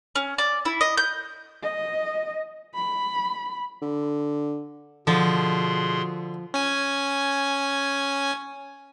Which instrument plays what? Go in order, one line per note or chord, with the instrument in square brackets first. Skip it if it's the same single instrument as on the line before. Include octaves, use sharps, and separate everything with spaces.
[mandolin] C#4
D5
E4
D#5
G6
[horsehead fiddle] D#5
B5
[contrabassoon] D3
[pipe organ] B2 G#4 C6 [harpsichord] D3 [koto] F3
[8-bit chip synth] C#4 G#5